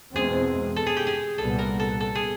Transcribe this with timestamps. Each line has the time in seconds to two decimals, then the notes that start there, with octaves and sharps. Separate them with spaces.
0.15 E2 B2 G#3 C4 G#4
0.76 A4
0.86 G#4
0.97 G4
1.07 G#4
1.38 C2 A#2 G3 B3 A4
1.59 A#4
1.80 A4
2.00 A4
2.15 G#4